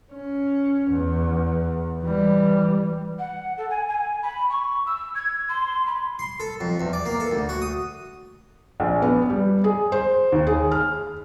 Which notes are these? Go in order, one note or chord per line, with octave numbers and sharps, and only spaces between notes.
C#4
E2
E3 G3
F#5
A4
G#5
G#5
B5
C#6
E6
G#6
C6
B5
C6
A4
F2
E2
D5
A#3
A4
D2
F#4
D#6
A#1
B3
G3
G#4
C5
D#2
G#4
F6